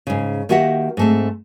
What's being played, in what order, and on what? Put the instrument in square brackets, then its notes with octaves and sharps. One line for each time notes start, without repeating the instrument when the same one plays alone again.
[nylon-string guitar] G#2 C#3
D#3 A#3 F#4 G4 E5 F#5
G#2 A3 C4